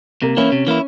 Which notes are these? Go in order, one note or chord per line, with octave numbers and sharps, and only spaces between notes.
C3 A#3
E3 A#3 C#4 E4
C3
E3 A#3 E4